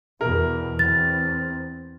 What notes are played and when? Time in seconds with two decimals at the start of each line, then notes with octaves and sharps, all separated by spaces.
0.21 E2 B2 A#4
0.79 E2 C4 A6